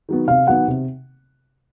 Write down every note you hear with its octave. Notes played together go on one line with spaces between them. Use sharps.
D#3 F#3 B3
C3 F5
D#3 F#3 B3 F#5
C3